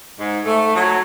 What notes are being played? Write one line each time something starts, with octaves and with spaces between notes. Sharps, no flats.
G#2
A3
F#3